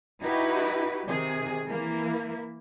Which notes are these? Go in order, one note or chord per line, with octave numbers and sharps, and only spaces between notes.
D#4 E4 F#4 G4 B4
C3 D#3 G#4
E3 A#3 E4